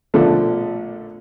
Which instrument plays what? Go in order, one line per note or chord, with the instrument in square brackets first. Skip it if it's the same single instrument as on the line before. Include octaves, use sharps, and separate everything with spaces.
[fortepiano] A#1 B2 D3 F3 A3 A4